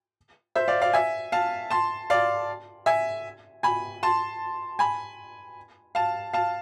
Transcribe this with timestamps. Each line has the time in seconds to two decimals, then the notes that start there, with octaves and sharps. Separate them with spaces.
0.56 C5 E5
0.68 D5 F5
0.81 D5 F5
0.93 E5 G#5
1.32 F5 A5
1.70 A5 C6
2.10 D5 F5
2.86 E5 G#5
3.63 G#5 B5
4.03 A5 C6
4.79 G#5 B5
5.95 F5 A5
6.33 F5 A5